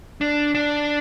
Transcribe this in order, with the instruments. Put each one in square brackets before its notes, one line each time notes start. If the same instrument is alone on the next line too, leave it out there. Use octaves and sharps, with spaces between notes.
[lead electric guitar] D4
D4